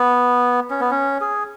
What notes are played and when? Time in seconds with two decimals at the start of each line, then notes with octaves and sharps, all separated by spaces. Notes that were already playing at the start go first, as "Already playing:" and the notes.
Already playing: B3
0.70 C#4
0.81 B3
0.91 C#4
1.21 G#4